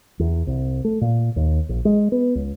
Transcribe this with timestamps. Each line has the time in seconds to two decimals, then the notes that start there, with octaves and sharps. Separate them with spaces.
0.19 E2
0.47 C2
0.85 A3
1.01 A#2
1.36 D#2
1.69 A#1
1.85 G#3
2.12 B3
2.35 C#2